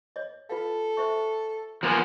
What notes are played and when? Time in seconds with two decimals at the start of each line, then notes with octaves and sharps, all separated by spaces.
0.16 C#5 D#5
0.49 F4 A4 B4 F5
0.97 C5 E5 C#6
1.83 F3 A#3 B3 F4 A#4 G#5